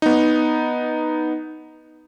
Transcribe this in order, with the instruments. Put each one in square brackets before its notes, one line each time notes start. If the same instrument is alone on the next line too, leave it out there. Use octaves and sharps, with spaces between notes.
[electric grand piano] B3 D#4